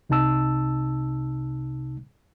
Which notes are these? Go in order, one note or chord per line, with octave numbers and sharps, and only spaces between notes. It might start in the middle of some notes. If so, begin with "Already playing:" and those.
C2 C3 D#4 A5 E6